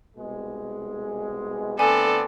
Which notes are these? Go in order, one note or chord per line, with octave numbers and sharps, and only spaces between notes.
C2 B2 G#3
D3 A3 B3 C4 A4 D5 G#5